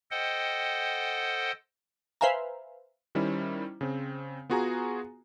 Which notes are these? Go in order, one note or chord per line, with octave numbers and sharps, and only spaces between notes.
A4 C5 D#5 F#5 G5
B4 C5 E5 F5 G#5 A#5
D#3 G3 C#4 E4 C5
C#3 C4
B3 F4 F#4 G#4 G#5 A#5